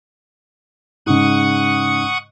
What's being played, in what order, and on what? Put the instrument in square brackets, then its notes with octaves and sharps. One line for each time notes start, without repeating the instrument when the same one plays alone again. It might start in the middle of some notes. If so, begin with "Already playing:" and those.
[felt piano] G#2 C#3 [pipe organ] F#5 C#6 D#6